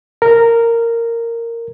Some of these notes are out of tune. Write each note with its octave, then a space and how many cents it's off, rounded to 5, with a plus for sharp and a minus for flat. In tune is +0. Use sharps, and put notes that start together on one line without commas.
A#4 -10